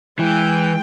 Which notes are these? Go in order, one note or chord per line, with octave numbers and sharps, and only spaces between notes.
E3 G#3 G5